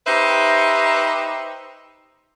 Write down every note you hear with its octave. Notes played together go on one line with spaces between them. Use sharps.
D#4 G4 B4 C5 E5